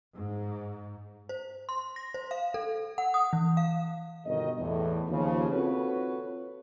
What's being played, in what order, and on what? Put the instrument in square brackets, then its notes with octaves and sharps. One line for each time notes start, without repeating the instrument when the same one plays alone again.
[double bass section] G#2
[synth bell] C5
C6
A#6
C5
F5
A4
F#5
D#6
E3
F5
[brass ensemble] G1 B2 D#3 D#5
E2 A2
D#2 C#3 F3
C4 F4 F#4 A4 B4 C#5